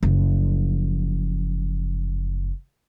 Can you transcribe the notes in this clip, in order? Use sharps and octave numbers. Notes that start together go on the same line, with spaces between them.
F#1 F3